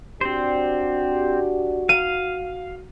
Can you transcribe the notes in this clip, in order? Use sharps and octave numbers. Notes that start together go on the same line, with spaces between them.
C4 D4 F#4 G4 C5 D5
F5 D#7